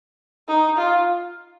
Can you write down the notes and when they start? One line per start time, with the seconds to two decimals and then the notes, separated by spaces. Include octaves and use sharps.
0.48 D#4
0.78 F4